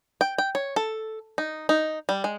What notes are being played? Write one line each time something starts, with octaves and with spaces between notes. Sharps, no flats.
G5
G5
C#5
A4
D#4
D#4
G3
G#3